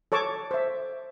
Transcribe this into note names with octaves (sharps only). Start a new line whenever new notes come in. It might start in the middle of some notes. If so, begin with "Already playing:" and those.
A4 C#5 A5 C#6 D6
C5 E5